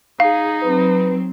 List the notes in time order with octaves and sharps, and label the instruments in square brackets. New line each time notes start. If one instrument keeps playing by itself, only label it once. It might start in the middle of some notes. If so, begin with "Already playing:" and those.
[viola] D#4 [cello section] G#4 [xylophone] F5
[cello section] F#3 C4 [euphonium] B4